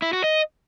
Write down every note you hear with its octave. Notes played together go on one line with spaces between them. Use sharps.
E4
F#4
D#5